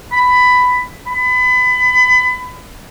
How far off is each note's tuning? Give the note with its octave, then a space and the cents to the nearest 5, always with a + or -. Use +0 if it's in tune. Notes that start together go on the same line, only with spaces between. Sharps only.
B5 +10
B5 +25